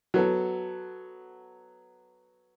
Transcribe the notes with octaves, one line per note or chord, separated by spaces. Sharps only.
F#3 B3 A4